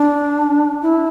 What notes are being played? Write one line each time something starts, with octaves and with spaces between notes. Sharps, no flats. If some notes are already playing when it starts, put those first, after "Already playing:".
Already playing: D4
E4